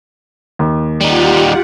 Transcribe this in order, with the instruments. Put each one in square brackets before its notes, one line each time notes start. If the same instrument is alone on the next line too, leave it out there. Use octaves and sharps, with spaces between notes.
[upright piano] D#2
[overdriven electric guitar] G3 D#4 [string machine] F4 G4 F#5